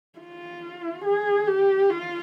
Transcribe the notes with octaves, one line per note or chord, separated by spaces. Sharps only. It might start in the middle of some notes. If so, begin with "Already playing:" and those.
F4
G#4
G4
F4